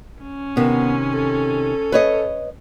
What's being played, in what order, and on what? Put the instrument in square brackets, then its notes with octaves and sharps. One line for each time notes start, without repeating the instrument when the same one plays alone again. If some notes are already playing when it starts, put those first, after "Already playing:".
[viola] C#4
[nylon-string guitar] C3 D#3 [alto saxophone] B3
[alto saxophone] A4
[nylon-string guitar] B4 C#5 D#5